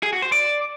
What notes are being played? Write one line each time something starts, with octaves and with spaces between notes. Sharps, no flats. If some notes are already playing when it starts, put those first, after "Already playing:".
G#4
F#4
C5
D5